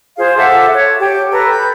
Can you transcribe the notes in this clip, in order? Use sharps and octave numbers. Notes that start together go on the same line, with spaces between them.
F4 G#4 C5 F5
A4 E5 F#5 D6
C#5
G4
A4 B4 A#5
B5 G6